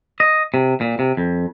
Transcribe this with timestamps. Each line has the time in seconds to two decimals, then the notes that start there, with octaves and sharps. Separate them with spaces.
0.20 D#5
0.54 C3
0.81 A#2
0.99 C3
1.17 F2